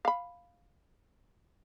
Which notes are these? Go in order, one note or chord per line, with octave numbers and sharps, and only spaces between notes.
F5 B5